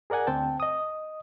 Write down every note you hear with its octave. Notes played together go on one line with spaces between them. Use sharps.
G#4 A#4 D5 F#5 G#5
D2 C4 G5 A5
D#5 D#6